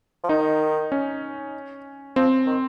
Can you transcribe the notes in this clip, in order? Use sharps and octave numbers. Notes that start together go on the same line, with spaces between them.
F3
D#3 D#4
C#4
F3 C4
D#3